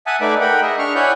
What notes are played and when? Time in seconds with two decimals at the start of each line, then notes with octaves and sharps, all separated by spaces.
0.07 E5 F#5 G#5 A5 D#6
0.21 A3 D#4 B4 D5 E5 D6
0.41 A#4 F#5 G5 B5
0.62 G#4 D#5 E5
0.79 D4 C#6 F6
0.95 E4 C#5 D5 F#5 G#5 G6